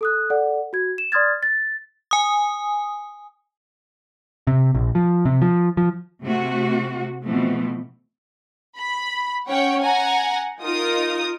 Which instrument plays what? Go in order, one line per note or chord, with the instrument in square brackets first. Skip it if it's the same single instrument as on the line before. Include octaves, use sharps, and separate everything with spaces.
[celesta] A4 D#6 F#6
A4 D5 F#5
F#4 G#6
E7
D5 C6 D#6 F6 G#6 A6
A6
[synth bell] G#5 D#6
[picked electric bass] C3
A#1
F3
C3
F3
F3
[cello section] C3 A3 F#4
B2 E3 F3 A3 C4
[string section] B5
C#4 C#5 F#5 G5
F#5 G#5 A#5
D#4 F4 A#4 D#6